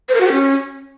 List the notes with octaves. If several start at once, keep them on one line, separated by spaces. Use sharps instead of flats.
C5
A#4
F#4
G4
C#4